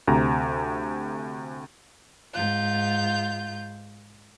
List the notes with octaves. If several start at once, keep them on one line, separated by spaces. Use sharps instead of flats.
D2 C3 A#5
G#2 F4 G6